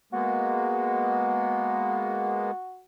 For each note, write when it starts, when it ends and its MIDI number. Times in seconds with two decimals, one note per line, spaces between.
0.13 2.51 56
0.13 2.51 58
0.13 2.51 59
0.13 2.84 66